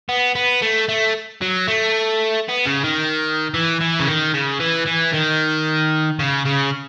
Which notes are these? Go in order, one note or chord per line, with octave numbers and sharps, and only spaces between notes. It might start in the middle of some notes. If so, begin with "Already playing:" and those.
B3
B3
A3
A3
F#3
A3
B3
C#3
D#3
E3
E3
C#3
D#3
C#3
E3
E3
D#3
C#3
C#3